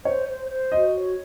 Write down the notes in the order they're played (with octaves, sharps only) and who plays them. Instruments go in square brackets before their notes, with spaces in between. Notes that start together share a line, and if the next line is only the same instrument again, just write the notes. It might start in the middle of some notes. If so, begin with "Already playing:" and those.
[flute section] C5 [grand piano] C#5
[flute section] C5
C5
[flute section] F#4 [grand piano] D#5
[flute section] C#5